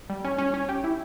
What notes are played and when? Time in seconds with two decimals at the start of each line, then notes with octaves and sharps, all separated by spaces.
0.10 G3
0.24 C#4
0.38 C#4
0.54 C#4
0.69 G4
0.84 E4